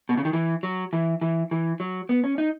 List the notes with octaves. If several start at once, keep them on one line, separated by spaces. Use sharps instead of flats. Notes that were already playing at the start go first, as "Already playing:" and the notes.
B2
C#3
D#3
E3
F#3
E3
E3
E3
F#3
B3
C#4
D#4